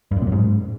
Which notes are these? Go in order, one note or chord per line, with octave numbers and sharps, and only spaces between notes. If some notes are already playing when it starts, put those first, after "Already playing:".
G2
F#2
A#2
F#2
G#2